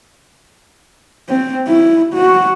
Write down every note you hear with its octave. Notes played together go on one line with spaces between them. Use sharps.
C4
E4
F#4